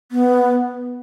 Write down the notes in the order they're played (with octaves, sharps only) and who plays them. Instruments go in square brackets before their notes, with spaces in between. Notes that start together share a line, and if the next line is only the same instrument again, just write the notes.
[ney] B3